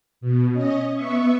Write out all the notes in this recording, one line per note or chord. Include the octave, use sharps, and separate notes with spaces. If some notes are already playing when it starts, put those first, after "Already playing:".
B2
C#4 D#5
B3 E5 C#6